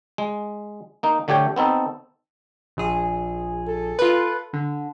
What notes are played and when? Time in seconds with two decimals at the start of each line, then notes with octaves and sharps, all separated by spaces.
0.18 G#3
1.03 A#3 D#4
1.28 D3 A3 G4 C#5 G5
1.56 B3 C4 D#4 A4
2.77 A#1 G#4
3.68 A4
3.99 F4 B4
4.53 D3